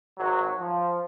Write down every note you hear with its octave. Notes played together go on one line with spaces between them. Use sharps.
G#1 F#3
F3